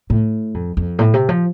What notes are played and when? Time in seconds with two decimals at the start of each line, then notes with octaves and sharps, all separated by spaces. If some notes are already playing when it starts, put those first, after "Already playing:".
0.10 A2
0.54 F2
0.77 F2
0.99 A2
1.14 C3
1.29 F3